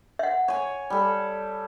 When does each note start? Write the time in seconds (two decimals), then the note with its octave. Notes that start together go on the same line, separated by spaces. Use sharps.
0.19 E5 F#5
0.48 C#5 G#5
0.90 G3 A4